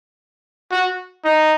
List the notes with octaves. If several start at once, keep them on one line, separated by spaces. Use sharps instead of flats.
F#4
D#4